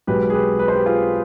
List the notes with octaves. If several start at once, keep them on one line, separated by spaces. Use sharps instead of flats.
B1 B2 G#3 G4 B4
G#4
G4 B4
B4
C5
G4 B4
F4 G#4